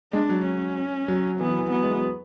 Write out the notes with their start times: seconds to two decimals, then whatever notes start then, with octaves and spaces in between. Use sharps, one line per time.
0.13 G#3 D4
0.29 F#3
0.46 C#4
1.08 F#3
1.40 E3 B3
1.49 F#3
1.59 E3
1.71 F#3 B3
1.83 G#3
1.96 F#3